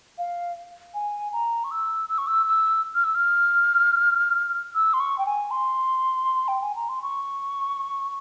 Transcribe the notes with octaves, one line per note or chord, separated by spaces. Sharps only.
F5
G#5
A#5
C#6
E6
E6
C#6
E6
E6
F6
E6
F6
E6
C6
C#6
G5
G#5
C6
G5
G#5
A#5
C6
C#6